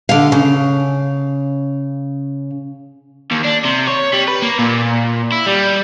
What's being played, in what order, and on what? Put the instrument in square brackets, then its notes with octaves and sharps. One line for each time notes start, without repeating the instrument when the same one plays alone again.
[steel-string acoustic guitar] D3 F5
C#3
[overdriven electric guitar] D#2
D4
C3
C#5
G3
B4
A#3
A#2
E4
G3